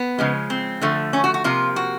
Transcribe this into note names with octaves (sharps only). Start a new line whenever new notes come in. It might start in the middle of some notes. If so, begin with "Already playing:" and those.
Already playing: B3
C#3 F3 G#3
C4
D3 F3 A3
C#4
F#4
F#4
C3 F3 A#3 F4
F#4